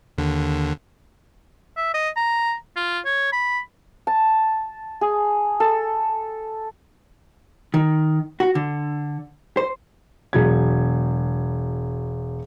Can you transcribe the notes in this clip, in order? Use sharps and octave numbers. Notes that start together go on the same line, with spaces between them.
D#2 D3
E5
D#5
A#5
F4
C#5
B5
A5
G#4
A4
D#3
F#4
D3
C5
E1 F#3 G#6